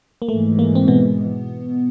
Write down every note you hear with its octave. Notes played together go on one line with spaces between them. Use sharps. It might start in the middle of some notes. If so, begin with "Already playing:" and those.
A#3
G#2 E3 G#3 A3
A#3
C4
B2 B3